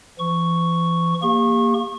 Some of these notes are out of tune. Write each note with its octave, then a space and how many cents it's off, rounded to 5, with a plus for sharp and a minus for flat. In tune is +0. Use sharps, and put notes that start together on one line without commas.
E3 +45 C#6 +0
A#3 +0 G4 +35 C#6 -30